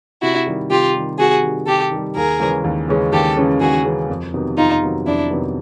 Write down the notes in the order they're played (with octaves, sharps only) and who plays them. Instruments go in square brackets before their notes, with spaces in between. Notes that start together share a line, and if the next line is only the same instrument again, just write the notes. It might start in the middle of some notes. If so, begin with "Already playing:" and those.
[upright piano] C3 [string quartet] E4 F#4
[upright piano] D#3 G3
[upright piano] C3 [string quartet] F4 G4
[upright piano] D#3 G3
[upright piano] C3 [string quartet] F#4 G#4
[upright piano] D#3 G3
[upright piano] C3 [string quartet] G4 A4
[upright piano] D#3 G3
[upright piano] D#2 [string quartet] G#4 A#4
[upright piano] C#3 E3 G#3 C#4
D#2
C#3 E3 G#3 C#4
[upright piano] D#2 [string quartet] G4 A4
[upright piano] C#3 E3 G#3 C#4
[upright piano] D#2 [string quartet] F#4 G#4
[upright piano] C#3 E3 G#3 C#4
F2
C3 D#3 F#3 B3
[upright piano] F2 [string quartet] D#4 F4
[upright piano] C3 D#3 F#3 B3
[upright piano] F2 [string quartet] D4 E4
[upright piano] C3 D#3 F#3 B3